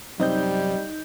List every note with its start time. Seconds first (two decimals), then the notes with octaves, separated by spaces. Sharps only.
0.20 F#2 C3 G3 C4 D#4 D#5 G6